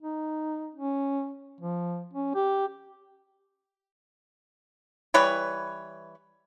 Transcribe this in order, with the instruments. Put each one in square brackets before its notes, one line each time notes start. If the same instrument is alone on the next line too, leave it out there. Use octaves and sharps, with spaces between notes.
[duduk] D#4
C#4
F3
C#4
G4
[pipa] E3 G3 B4 C#5